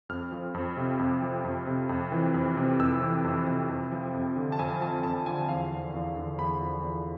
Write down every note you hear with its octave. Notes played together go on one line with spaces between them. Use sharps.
F2 F6
F3
F2
C3
F2
F3
F2
C3
F2
E3
F2
C3
F2 E6
E3
F2
C3
F2
F3
F2
D3
A5
F2 G#5
F3 A5
F2 A5
D3 G#5
E2 F5
F3
E2
D3
E2 B5
F3
E2